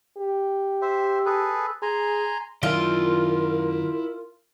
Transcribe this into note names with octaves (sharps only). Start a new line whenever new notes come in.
G4
C5 E5
G#4 A4 B4
G#4 G#5 A#5 C6
F#2 D#3 E4 F4 A#4 D5 E5